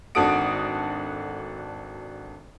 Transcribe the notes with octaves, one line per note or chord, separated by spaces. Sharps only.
G#1 D4 F#4 A4 D#6 D7